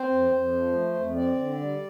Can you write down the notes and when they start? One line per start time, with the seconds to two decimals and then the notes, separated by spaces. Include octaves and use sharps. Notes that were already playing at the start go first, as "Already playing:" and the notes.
Already playing: C4 C5
0.10 F2
0.31 F2
0.52 F3
0.73 A3
0.94 F2
1.15 C4 D5
1.37 D3
1.57 G3